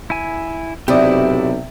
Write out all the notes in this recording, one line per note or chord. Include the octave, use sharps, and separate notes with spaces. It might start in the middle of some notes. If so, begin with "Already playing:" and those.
E4 G#5
B1 C3 E4 G4 D5 D#6